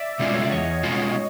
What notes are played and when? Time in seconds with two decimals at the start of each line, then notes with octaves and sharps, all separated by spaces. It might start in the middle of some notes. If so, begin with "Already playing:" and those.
Already playing: D5 E5
0.19 B2 G#3 C#4 F4
0.33 C#5
0.42 D5
0.51 E2 C#5 D#5
0.83 B2 G#3 C#4 F4